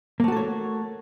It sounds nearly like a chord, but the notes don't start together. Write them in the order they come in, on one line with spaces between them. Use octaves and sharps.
A#3 A3 F#4 A4 C#5